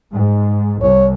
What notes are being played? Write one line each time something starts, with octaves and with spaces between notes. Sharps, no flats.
G#2
C2 C#5